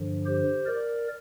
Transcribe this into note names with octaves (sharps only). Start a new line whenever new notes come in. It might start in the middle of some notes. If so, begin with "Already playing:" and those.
Already playing: G2 D3 F3
G4 C5
A#4 D5